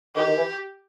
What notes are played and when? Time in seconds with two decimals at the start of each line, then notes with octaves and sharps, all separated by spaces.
0.15 D#3 G4
0.25 D#3
0.36 E3